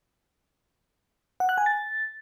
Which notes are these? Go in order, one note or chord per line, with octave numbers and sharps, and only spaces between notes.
F#5
F#6
G#5
A6